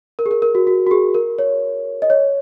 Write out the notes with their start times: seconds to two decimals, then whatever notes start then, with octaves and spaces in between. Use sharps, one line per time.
0.19 A#4
0.26 G#4
0.31 A#4
0.42 A#4
0.55 F#4
0.67 F#4
0.87 F#4
0.91 G#4
1.14 A#4
1.39 C#5
2.02 D#5
2.10 C#5